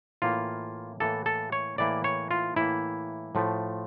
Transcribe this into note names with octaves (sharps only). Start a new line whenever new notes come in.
A2 E3 A#3 F4
A2 E3 A#3 A4
A4
C#5
A2 E3 A#3 D5
C#5
F4
A2 E3 A#3 E4
A2 F3 A3